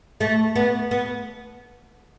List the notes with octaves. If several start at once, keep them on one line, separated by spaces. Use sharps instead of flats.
A3
B3
B3